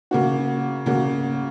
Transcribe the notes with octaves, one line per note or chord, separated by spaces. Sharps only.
C#3 A#3 F#4
C#3 A#3 F#4